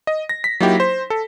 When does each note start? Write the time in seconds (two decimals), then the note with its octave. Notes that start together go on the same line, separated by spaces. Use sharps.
0.07 D#5
0.29 A#6
0.44 B6
0.60 F#3 A#3 D#4 E4 G4
0.80 C5
1.10 A4